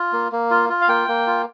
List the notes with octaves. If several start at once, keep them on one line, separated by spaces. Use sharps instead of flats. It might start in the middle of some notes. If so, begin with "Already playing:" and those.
Already playing: F4
A#3
A#3
F4
F4
F5
A#3 G5
A#3
F4